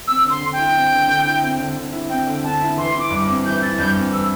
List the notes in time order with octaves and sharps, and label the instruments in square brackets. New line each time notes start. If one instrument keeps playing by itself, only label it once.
[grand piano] C4 [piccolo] E6
[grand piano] D3
[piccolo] C6
[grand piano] D3
[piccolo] G5
[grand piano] E4
C4
D3
D3
E4
C4
D3
D3
E4
[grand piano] C4 [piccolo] G5
[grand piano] D3
[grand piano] D3 [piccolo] A5
[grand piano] E4
[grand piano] E3 [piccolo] C6
[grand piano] E4
[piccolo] D6
[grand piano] G2
[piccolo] D6
[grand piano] C4
[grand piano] E3 [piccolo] G6
[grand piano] E4 [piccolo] A6
[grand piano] G2 [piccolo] G6
[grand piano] C4
[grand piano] E3 [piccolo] E6